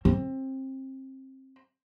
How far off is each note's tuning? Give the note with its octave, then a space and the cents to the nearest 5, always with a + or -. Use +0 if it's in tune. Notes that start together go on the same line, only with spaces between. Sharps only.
C4 +25